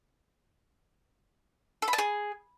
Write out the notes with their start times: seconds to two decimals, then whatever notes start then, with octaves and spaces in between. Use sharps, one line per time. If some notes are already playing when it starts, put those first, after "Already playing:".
1.82 A4
1.88 B5
1.93 A5
1.98 G#4